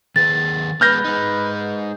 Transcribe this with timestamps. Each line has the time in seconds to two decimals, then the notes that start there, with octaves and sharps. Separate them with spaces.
0.16 D#3 G#4 B4 A6
0.81 G#3 B3 B4 F6 G6 A#6
1.04 G#3 D#4